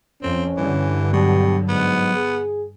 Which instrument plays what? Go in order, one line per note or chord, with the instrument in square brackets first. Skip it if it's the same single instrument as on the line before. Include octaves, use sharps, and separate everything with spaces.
[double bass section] F2 [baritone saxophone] C4 [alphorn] C#4
[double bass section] G2 D3 [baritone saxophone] E3
[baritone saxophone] B2 [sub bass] F#3 [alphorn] G4
[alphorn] G#2 [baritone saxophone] B3
[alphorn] G#4